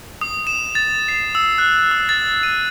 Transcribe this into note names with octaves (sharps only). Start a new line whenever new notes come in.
D#6
E7
A6
C7
E6
F#6
E6
A6
D#7